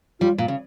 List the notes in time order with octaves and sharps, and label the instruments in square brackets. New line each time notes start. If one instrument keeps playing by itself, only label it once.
[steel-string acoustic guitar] G3 [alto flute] F4
[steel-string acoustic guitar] A#2
C#3